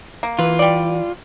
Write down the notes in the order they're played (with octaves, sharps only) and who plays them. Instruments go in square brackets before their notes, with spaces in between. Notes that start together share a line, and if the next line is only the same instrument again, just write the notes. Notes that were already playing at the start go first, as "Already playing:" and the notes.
[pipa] A#3
[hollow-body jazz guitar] E3 B4 [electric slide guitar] F4
[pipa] G3 D5